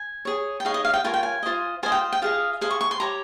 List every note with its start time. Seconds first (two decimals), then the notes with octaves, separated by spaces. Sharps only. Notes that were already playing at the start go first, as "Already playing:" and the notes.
Already playing: G#5
0.25 G#4 C#5
0.60 G5
0.65 D#4 G#4 C#5 F5
0.74 D#5
0.85 F5
0.94 G5
1.04 F4 A#4 C#5 G#5
1.14 G5
1.23 G#5
1.43 F4 C5 D#5
1.83 F4 C5 D#5 G#5
1.92 G5
2.12 G5
2.22 F4 G#4 D#5 F5
2.61 G#4 C5 D#5 F5
2.70 C#6
2.81 C#6
2.91 C6
3.00 G4 C#5 A#5